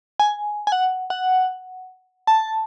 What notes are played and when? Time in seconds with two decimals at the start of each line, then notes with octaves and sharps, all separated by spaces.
0.20 G#5
0.67 G#5
0.72 F#5
1.10 F#5
2.27 A5